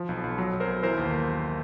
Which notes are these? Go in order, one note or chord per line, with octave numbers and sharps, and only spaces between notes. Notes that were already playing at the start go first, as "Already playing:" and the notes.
Already playing: F3
B1
B1
F#3
B1
A#4 C5
B1
E3 A#4 C5
D#2